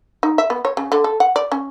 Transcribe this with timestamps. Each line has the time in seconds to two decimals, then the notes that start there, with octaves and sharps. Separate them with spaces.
0.23 D#4
0.38 E5
0.50 B3
0.65 C#5
0.77 C#3
0.92 D3
1.04 A4
1.20 F#5
1.36 D5
1.52 C#4